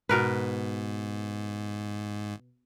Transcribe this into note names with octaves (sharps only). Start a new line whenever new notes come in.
G#2 B2 A#4 B4